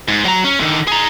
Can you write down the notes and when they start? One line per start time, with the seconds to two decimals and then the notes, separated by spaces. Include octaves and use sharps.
0.08 G#2
0.25 F#3 A#5
0.44 C#4
0.60 D3 D#3
0.87 G#4 A#5